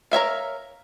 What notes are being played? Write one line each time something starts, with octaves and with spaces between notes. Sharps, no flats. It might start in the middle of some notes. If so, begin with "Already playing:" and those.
A#4 C#5 E5 F5